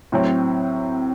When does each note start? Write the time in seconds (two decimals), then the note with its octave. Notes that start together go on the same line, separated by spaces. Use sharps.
0.12 A2 F#3 C4